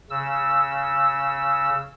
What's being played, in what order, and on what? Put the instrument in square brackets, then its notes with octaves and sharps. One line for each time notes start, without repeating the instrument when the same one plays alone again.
[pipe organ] C#3 E6